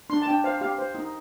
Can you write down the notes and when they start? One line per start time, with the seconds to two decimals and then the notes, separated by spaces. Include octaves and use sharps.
0.10 D4 C6
0.22 A5
0.27 D4 G5
0.44 C5 F5
0.61 G4 F5
0.78 C5
0.95 D#4